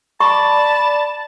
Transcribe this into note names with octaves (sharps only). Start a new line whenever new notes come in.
D5 A5 B5 C#6